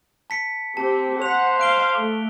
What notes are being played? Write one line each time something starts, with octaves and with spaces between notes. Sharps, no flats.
A5 B6 C#7
C4 G4 A5
C5 F#5 B6 F7
F5 F#6 D7 G7
A3 D6